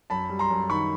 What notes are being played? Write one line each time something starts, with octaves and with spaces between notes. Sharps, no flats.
F#2 A5 B5
G3
A#5 C6
F#2
D#3 B5 C#6